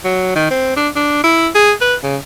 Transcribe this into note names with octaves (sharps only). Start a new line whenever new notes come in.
F#3
D#3
C4
D4
D4
E4
G#4
B4
C#3